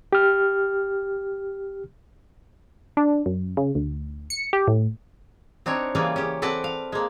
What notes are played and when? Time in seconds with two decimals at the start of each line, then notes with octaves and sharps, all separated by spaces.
0.13 G4 F6
2.97 D4
3.26 F#2
3.57 C#3
3.75 D2
4.30 C#7
4.53 G4
4.68 A2
5.66 C4 D4 D#4 C#5
5.95 C#3 E3 G3 A#3 F4 G#4
6.16 C#4 G4
6.42 C4 A4 B4 D5 F#5 A5
6.64 F5
6.92 G#3 A#3